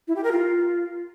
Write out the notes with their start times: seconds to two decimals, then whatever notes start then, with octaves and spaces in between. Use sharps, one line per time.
0.08 E4
0.16 G4
0.24 A#4
0.32 F4